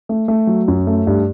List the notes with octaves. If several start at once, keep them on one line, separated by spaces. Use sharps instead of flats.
A3
A3
F#3
F#2
A3
G2